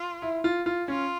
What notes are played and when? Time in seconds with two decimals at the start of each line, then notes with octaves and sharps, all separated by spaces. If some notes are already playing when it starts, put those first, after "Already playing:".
Already playing: F4
0.22 E4
0.44 F4
0.66 F4
0.88 C#4 F4